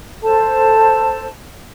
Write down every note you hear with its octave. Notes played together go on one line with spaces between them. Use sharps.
A4 C5 A5